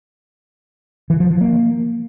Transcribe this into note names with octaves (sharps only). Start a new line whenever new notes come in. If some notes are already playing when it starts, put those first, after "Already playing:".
E3
F3
F3
A#3